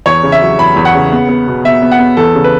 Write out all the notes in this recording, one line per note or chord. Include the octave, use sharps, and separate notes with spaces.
E2 C#5
C#3
E5
F#3
E2 B5
E2
F#5
C#3
B3
B3
B2
B2 E5
B3
F#5
B3
E2 A4
C#3
B4